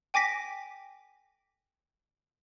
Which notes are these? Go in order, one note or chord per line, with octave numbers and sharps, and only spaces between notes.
G5 G#5 D6 A#6 B6